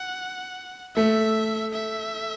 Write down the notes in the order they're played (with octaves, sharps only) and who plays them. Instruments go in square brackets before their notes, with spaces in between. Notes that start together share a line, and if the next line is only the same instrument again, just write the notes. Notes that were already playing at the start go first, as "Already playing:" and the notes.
Already playing: [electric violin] F#5
[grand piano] A3 [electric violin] E5
[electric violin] E5